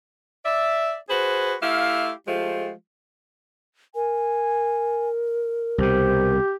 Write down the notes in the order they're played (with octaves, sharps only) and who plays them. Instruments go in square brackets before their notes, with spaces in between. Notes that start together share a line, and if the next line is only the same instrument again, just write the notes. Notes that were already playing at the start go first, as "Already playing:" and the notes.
[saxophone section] D5 E5
F#4 G#4 B4 C5
A3 E4 G4 F5
F3 G#3 A3 F4 G4
[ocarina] A#4 [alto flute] G#5
[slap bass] C2 B2 [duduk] G4 [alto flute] C5